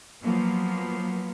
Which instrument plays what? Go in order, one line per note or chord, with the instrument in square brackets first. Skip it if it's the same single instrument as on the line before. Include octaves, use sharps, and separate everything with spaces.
[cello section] F3 F#3 A#3 B3